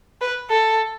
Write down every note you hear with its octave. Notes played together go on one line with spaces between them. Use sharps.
B4
A4